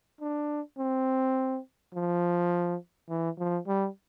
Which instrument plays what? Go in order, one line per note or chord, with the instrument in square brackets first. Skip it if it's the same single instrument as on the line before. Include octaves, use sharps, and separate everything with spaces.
[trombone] D4
C4
F3
E3
F3
G3